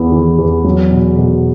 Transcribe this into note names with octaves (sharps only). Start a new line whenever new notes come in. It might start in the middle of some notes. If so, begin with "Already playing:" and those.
Already playing: E2 B3 E4
E3
E2
F#3
B2
B2